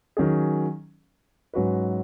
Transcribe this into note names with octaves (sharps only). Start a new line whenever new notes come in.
D#3 F#3 C#4 G#4
G#2 F#3 C#4 F#4 B4